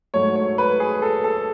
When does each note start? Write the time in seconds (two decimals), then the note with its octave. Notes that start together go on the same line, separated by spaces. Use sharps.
0.14 G#2 F#3 A3 C#5
0.36 C#5
0.58 B4
0.80 G#4
1.02 A4
1.24 A4